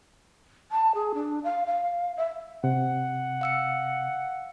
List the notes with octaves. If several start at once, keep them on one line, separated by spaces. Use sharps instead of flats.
A5
G#4
D4
F5
F5
E5
C3 F#5
F5 E6 C#7